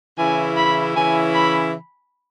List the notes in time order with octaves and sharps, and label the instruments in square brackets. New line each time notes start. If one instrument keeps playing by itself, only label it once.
[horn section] C#3 E3 C#4 E4 [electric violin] G#5
[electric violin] B5
[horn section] C#3 E3 C#4 E4 [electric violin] G#5
[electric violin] B5